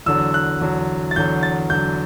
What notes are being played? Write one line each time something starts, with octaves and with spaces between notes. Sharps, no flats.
E2 D3 F#3 E6
F#6
E2 D3 F#3
A6
E2 D3 F#3 G6
A6
E2 D3 F#3 G6